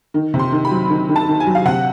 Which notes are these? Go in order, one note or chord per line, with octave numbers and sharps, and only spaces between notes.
D#3
C3
C6
D#3
B5
F#3
D#3
D#3
A5
D#3
G#5
F#3
F5
C3 F#5